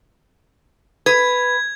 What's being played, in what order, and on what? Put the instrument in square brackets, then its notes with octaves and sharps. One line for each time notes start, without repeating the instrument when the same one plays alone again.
[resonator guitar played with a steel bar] B4 [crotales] G#6